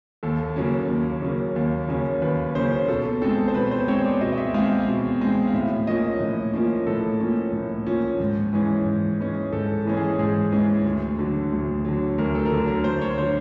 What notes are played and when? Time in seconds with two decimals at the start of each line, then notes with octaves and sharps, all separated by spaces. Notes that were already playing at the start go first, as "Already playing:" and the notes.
0.23 D#2 A4
0.56 C#3 F#3 A#3 C#4
0.89 D#2
1.22 C#3 F#3 A#3 C#4
1.56 D#2
1.89 C#3 F#3 A#3 C#4
2.22 D#2 B4
2.55 C#3 F#3 A#3 C#4 C5
2.88 B2 A4
3.22 G#3 C4 A4
3.48 C5
3.54 B2 B4
3.71 C5
3.88 G#3 C4 C#5
4.05 D5
4.21 B2 D#5
4.33 D#5
4.37 E5
4.54 G#3 C4 F5
4.71 E5
4.88 B2
5.21 G#3 C4
5.47 F5
5.54 A2 E5
5.87 F3 A#3 C#4 D#5
6.20 A2
6.54 F3 A#3 C#4
6.87 A2 A4
7.20 F3 A#3 C#4
7.53 A2
7.87 F3 A#3 C#4
8.20 G#2
8.53 E3 G#3 C#4
8.86 G#2
9.19 E3 G#3 C#4
9.53 G#2 A4
9.86 E3 G#3 C#4
9.97 G#4
10.19 G#2 G#4
10.52 E3 G#3 C#4
10.85 D2
11.18 D3 F#3
11.52 D2
11.85 D3 F#3
12.18 D2 A#4
12.35 A4
12.45 A#4
12.51 D3 F#3 A4
12.68 A#4
12.84 D2 C5
13.02 C#5
13.18 D3 F#3 C5